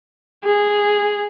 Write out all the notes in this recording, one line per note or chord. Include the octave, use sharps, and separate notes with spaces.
G#4